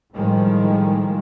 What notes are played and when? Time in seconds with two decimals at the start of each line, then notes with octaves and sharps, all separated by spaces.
0.12 A2 D#3 F3 G3 G#3